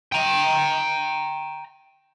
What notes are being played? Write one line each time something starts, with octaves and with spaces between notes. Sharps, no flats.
G5 A#5